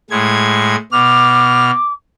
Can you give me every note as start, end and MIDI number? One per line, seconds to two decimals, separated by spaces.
0.10 0.76 45
0.10 0.76 56
0.10 0.76 92
0.92 1.71 47
0.92 1.93 86
0.92 1.71 89